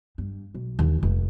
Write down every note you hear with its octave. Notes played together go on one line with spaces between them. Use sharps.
G2
B1
D#2 E3
F1 D2